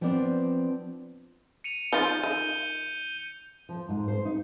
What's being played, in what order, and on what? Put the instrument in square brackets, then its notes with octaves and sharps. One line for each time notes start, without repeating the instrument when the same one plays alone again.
[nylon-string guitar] F3 B3 C4 D4 D5
[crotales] C#7 D#7 F7
[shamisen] F3 D#4 F4 [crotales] G6 G7
[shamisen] D#3 [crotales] D#7
[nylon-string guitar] F3
G#2
C5
D#4